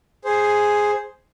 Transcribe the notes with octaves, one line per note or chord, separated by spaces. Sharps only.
G#4 C5